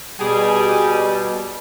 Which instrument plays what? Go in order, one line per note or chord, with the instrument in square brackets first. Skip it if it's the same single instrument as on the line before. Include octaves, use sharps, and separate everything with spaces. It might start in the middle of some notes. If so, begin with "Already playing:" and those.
[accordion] B2 G3 [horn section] G4 G#4 G#5